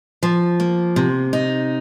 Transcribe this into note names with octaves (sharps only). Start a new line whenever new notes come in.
F3
A#3
C3
D#4